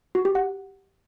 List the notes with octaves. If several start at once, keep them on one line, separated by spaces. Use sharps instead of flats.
F#4
G4
F#5